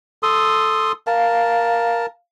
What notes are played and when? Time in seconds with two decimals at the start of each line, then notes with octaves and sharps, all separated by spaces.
0.23 A4 C6 D#6
1.07 A#4 F5 A5